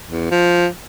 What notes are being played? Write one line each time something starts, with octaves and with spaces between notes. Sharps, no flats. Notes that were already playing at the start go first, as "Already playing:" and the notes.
E2
F3